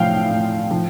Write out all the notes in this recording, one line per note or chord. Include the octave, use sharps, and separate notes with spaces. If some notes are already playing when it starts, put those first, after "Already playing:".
Already playing: A2 F3 F5 G5
A2
F3